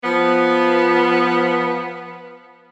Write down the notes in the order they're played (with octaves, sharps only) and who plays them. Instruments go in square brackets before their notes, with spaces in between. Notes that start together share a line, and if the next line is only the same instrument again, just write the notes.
[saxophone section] F3 B3